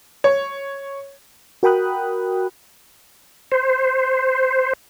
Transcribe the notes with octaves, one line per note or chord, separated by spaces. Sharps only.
C#5
F#4 A#4 G5 B5 D#6 F#6
C5